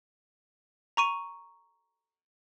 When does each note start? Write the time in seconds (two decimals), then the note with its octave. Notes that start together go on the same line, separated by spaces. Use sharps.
0.97 A#5 C#6 D#7